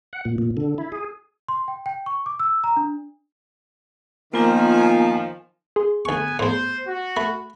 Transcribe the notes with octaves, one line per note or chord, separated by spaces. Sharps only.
F#5
A#2
A#2
D3
E4
G#4
C6
G5
G5
C#6
D6
E6
A#5
D4
D#3 F3 A#3 B3 F4 G#5 A#5
G#4 C6
D2 B3 G#5 C#6
E2 A2 C5
F#4
A3 B5